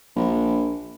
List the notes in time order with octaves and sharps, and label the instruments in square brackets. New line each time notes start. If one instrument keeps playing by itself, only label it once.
[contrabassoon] A#1